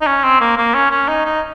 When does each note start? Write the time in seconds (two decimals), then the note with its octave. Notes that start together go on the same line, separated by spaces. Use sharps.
0.01 D#4
0.07 C#4
0.24 C4
0.41 A#3
0.57 A#3
0.74 C#4
0.91 C#4
1.08 D#4
1.25 D#4